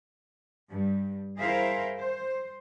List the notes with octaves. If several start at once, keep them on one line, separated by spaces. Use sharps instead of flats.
G2
E4 G#4 A#4 C5 E5 F5
C5